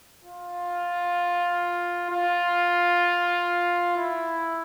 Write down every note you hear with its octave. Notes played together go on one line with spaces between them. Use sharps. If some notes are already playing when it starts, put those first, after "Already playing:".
F4
F4
E4